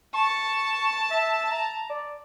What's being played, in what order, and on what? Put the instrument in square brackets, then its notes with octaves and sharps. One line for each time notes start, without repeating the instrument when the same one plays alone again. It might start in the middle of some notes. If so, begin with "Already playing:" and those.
[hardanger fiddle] A5 [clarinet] C#6
[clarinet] E5
A#5
D5